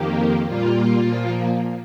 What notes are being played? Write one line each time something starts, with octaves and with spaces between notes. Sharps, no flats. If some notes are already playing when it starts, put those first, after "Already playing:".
Already playing: F2 D#3 A#3 G4
A#2 G3 A#3 F4
A#2 F3 A#3